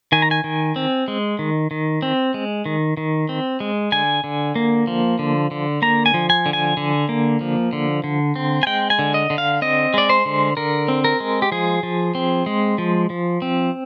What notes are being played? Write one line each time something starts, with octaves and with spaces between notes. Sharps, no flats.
D#3 G#5
A#5
G#5
D#3
C4
G#3
D#3
D#3
C4
G#3
D#3
D#3
C4
G#3
D3 G#5
D3
A#3
F3
D3
D3
A#3 A#5
G#5
F3
G#5
D3
G#5
D3
A#3
F3
D3
D3
C4
G#5
G#3 G5
G#5
D3
D#5
D3
F5
C4 D#5
G#3 D5
C5
D3
D3 A#4
C4
A#4
G#3
G4
F3 G#4
F3
C4
G#3
F3
F3
C4